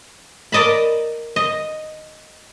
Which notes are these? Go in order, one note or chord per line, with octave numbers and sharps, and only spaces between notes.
A#4 D5 D#5 A5 B5
D#5